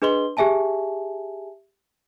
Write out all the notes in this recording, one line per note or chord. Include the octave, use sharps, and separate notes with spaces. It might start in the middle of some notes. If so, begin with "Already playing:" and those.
D4 G#4 B4 D#5 C6 G7
G4 G#4 E5 G#5 A5